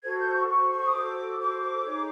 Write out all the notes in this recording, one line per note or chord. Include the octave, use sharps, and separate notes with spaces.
F#4 A4 C5 G#6
G6
C#6
F#4 A4 C5 C#6
C#6
D#6
F#4 A4 C5 D6
F#4 A4 C5 D6
D#4 G#4 C#5